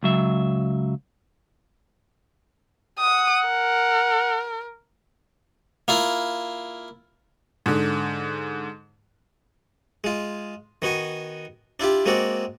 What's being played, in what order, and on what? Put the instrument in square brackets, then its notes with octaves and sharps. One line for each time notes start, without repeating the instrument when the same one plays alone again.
[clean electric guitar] C#2 F#3 E5
[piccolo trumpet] F#5 [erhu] D#6
[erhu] A#4
[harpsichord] A#3 E4 F4
[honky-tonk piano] G#2 D3
[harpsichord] G#3 F4
D#3 B3 F#4 G#5
D4 E4 F4 G4
G#3 A#3 C4 F#4 D5